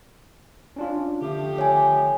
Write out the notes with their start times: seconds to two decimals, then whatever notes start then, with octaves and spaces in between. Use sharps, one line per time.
0.76 C#4 D4 F4
1.21 D3 F3 A3 G4
1.58 C#5 G#5